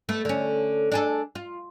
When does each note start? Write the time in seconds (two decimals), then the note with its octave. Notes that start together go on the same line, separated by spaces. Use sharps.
0.09 A3 B3
0.25 D3 C#4
0.92 D4 G#4 A4
1.35 F4